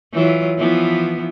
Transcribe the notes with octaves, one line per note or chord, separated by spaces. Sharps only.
E3 F#3 F4
E3 F3 B3